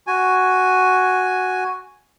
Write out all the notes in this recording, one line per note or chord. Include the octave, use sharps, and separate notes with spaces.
F#4 G#5